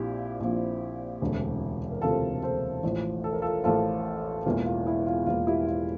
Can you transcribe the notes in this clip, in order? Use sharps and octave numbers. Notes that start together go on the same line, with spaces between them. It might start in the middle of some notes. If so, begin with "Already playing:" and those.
Already playing: A#1 A#2 F3 C4 E4 G4
A#1 A#2 F3 C4
E1 D2 C3
A#4
E1 D2 C3 F4 A4
A4 C5
A1 A2 F3
A4
A#4
F4 A4
A1 A2 F3 F4 A4
E1 E2 E3 A#3 F4
F4
E4
F4
E1 E2 E3 A#3 F4
E4 G4
F4